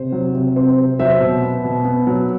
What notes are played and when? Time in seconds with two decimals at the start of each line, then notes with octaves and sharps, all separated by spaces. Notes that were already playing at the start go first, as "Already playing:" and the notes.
Already playing: C3 C5
0.12 F#3
0.35 C3
0.56 C4
0.78 C3
0.99 F#3 C5 E5
1.20 B2
1.42 B3
1.64 B2
1.85 B3
2.07 F#3